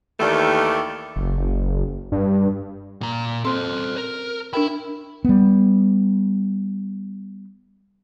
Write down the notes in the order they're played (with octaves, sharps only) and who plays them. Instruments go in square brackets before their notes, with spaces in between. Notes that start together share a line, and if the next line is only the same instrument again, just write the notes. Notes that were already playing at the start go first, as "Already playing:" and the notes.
[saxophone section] D#2 D#3 E3 A3 G4 D5
[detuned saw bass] F#1
G2
[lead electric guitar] A#2 A#5
[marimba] C4 C6 [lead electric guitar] A4 C5
[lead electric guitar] A#4
[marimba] D4 A#4 G5 [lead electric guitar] E5 B5
[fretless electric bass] G3 B3